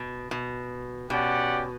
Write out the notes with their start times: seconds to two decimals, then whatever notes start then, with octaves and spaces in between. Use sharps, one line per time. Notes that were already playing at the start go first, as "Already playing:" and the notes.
Already playing: B2
0.31 B2
1.10 B2 C#4 G4 D5 F#5